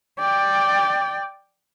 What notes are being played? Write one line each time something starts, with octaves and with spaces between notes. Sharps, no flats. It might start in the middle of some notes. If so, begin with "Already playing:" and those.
D5 G5